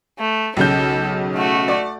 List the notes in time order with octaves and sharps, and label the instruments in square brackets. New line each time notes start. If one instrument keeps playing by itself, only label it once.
[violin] A3
[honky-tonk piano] B1 C#3 G6 [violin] A4
[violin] A3 F#4
[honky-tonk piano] D5